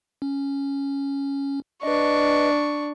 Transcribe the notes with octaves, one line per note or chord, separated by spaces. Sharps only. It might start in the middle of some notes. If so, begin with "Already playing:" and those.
C#4
D4 B4 D#5 C#6